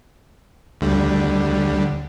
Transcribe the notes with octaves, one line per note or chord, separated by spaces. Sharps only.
D2 D3 G3